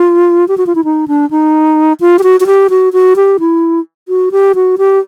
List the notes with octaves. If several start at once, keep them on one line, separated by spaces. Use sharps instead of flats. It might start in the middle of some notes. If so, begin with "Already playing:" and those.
Already playing: F4
G4
F#4
F4
E4
D#4
D4
D#4
F4
G4
F#4
F#4
G4
F#4
F#4
G4
E4
F#4
G4
F#4
G4